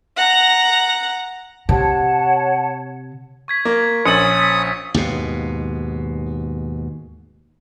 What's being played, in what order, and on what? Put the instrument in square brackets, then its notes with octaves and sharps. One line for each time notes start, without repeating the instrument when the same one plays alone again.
[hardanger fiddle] F#5 A#5
[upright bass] C3 [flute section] C#5 F#5 A5
[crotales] C#6 G#6 B6
[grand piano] A#3
[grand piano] A#1 C#4 F#7 [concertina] D#6 [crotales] A6 C#7
[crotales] B6
[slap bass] D#2 G#2 B2